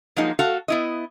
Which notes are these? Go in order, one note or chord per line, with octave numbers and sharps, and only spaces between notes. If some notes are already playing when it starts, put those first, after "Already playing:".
F3 F#3 G#3 A#3 D#4
A3 F#4 A4 F5
B3 E4 D#5